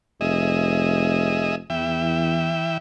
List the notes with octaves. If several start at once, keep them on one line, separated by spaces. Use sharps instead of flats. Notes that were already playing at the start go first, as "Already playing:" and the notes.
F1 G#4 D#5 E5
E2 E3 E5 G5